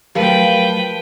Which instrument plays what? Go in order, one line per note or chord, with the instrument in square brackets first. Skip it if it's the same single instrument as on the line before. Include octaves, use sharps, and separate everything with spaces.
[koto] F3 [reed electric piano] F#3 A3 [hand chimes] G4 A#4 [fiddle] B4 G5